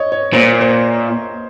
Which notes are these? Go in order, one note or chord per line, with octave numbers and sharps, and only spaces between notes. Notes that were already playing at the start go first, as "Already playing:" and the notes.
Already playing: C#5 D#5
C#5
A#2 C5
C5